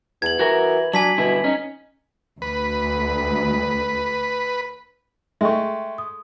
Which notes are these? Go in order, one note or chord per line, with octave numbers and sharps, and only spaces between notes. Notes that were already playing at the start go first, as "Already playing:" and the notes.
E2 G#6 F#7
E3 F#4 A#4
F#3 D4 G#5 B6 F#7
G2 B2 D3 E4
C#4 D#4
D2 B4
G#3 A3 E5 G5 C#6
D#6